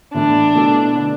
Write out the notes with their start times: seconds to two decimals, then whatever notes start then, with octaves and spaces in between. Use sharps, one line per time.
0.14 A2 E3 A3 D4
0.55 B2 A3 E4 A4
0.95 D3 B3 D4